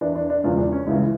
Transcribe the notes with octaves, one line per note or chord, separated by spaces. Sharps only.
E2 E3 D4
D4
D4
E1 E2 C#3 F3 F4
D4
C#4
C#2 C#3 E3 E4